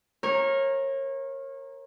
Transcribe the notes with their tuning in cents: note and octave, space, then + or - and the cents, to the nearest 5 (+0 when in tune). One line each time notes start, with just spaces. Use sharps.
A#4 +0 C#5 -30